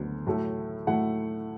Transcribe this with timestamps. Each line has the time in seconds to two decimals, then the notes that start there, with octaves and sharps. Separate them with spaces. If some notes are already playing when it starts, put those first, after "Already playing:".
Already playing: D2 D3 F#3 B3
0.27 A2 F#3 A3 E4
0.87 A2 F#3 A3 E4 F#5